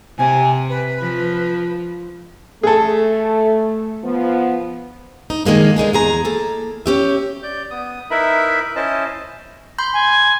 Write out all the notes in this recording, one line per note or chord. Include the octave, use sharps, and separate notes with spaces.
C3 G#5
B4
F3
A3 G#4 A4
F3 B3
D#4
D#3 G#3 A#3 D4
D3 G#3 D#4 G#4
E2 G#4 A#5
A#3 A4
C#4 G4 E5
D5 G6
B3 D#6
D#4 E4 A#4 B4 E5 B5
C#4 E4 C5 D#5 A5
B5 C6 G6
G#5